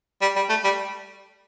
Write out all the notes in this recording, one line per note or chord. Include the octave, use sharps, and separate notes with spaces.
G3
G3
A3
G3